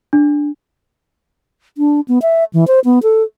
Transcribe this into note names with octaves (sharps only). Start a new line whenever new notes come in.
D4
D4
B3
E5
E3
C5
B3
A4